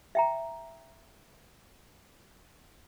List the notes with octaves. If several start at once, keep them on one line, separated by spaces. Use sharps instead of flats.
E5 G5 A#5